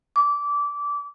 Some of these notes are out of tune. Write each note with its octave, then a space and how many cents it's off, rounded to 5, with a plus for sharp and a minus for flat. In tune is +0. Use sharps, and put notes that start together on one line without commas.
D6 -20